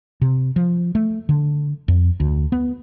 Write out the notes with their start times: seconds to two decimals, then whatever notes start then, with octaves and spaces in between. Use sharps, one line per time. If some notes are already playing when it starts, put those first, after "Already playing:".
0.21 C3
0.56 F3
0.95 A3
1.29 D3
1.88 F2
2.20 D2
2.52 B3